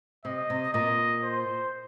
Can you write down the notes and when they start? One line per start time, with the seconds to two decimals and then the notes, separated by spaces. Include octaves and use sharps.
0.25 C3 D#5
0.50 C3
0.73 A#2 D#5
1.23 C5